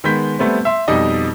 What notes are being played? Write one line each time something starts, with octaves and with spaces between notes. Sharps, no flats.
D#3 G#3 B3 B5 G6 B6
G3 A3 B3 C4
E5 C6
F2 B2 G3 D#4 D5 D#5